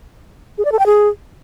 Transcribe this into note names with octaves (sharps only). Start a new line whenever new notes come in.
G#4
D5
A4
G5
G#4